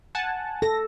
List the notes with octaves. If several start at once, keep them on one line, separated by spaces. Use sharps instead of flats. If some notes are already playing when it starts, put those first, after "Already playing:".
F#5 G#5 A5
A4 A#6